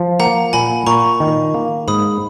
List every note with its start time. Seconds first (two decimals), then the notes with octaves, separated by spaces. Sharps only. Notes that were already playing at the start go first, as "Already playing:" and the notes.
Already playing: F3
0.20 A#3 F#5 A#5
0.53 A#2 G#5 B5
0.86 A#2 A#5 C#6
1.20 D#3
1.54 A#3
1.88 G#2 B5 D#6